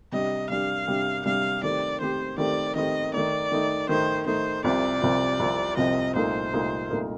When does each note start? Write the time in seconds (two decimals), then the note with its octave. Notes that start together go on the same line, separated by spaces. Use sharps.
0.12 C3 G3 D4 G4 D#5
0.50 C3 G3 D4 G4 F5
0.88 C3 G3 D4 G4
1.25 C3 G3 D4 G4 F5
1.63 D#3 A3 C4 G4 D5
2.00 D#3 A3 C4 G4 C5
2.38 D#3 A3 C4 G4 D5
2.76 D#3 A3 C4 G4 D#5
3.14 D#3 A3 D#4 D5
3.52 D#3 A3 D#4
3.89 D#3 A3 D#4 C5
4.26 D#3 A3 D#4 C5
4.64 C2 C3 F3 C4 D5
5.02 C2 C3 F3 C4
5.39 C2 C3 F3 C4
5.77 C2 C3 F3 C4 D#5
6.15 C2 A#2 A3 D#4 A#4 C5
6.53 C2 A#2 A3 D#4 A#4
6.90 C2 A#2 A3 D#4 A#4